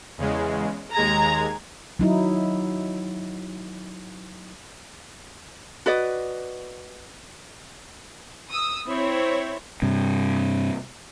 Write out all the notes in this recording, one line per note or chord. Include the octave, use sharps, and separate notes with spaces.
E2 C#3 G#3
D#2 G#3 A#5 G#6
F#3 D#4 E4
F#4 B4 D5 D#5
D#6 E6
C4 E4 C5 C#5
G2 C3